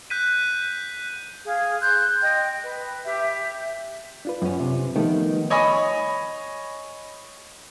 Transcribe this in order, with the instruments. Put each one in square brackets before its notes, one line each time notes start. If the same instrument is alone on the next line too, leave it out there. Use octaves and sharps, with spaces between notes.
[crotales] F#6 G6 B6 D#7
[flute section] G#4 F5
C6 F#6 G6
D#5 G5
B4
G4 E5
[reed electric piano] D4 F4 B4
[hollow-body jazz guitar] F#2 C#4
C3
[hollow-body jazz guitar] D#3 B3 [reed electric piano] F3 G3 A3
[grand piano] C#5 D#5 G#5 B5 D#6